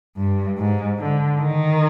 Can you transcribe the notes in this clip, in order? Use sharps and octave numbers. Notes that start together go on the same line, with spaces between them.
G2
G#2
D3
D#3